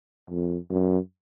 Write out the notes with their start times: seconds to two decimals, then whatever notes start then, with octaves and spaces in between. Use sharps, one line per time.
0.29 F2
0.70 F#2